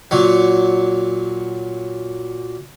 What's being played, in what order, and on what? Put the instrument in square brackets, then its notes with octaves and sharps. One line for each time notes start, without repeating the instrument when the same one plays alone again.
[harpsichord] A#2 F#3